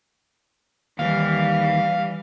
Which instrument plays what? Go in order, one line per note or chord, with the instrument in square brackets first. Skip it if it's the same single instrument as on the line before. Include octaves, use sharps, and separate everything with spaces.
[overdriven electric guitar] D#2 [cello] E3 G3 [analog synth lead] F5